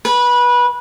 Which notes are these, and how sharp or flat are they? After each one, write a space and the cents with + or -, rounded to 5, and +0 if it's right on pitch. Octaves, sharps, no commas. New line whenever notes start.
B4 -20